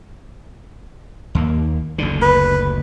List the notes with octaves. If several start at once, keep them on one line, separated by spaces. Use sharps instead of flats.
D#2 A#3
F#1 D2 D3
B4